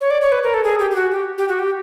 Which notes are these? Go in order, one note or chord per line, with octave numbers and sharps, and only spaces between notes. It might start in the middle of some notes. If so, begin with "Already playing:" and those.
C#5
D5
C#5
B4
A#4
A4
G#4
G4
G4
F#4
G4
G4
F#4
G4